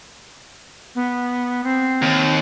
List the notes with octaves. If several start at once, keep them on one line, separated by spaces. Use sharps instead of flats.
B3
C4
D#2